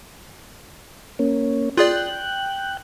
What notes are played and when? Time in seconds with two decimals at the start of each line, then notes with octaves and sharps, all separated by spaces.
1.19 A#3 C#4
1.77 F4 G#4 D5 G5 F#6